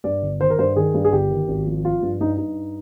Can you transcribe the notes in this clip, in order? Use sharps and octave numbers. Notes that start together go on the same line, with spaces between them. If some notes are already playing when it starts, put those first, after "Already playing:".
G2 D5
G1
D#3 C5
A#4
G2 C5
D#3 G#4
G2
G#4
G1 G4
D#3
G#1
F3
F3 F4
G2
G2 D#4
G2 D#4